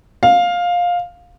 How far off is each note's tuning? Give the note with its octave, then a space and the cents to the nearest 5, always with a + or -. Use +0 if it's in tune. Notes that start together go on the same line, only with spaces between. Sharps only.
F5 +15